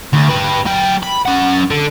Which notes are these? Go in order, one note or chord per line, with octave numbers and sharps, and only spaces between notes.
D2
G4 B4
F#3 G5
B5
C#4 F#5
D3